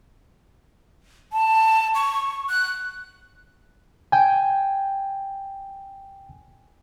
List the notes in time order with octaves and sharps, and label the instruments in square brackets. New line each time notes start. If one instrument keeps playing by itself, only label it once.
[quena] A5
C#6
F#6
[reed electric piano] G5 G#5